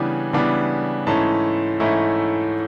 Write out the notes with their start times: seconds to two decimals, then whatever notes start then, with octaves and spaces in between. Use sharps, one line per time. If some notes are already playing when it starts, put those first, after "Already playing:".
Already playing: C#3 E3 G3 B3 D4 G#5
0.33 C#3 E3 G3 B3 D4
1.06 G#2 E3 A3 C#4 E4 A5
1.80 G#2 E3 A3 C#4 E4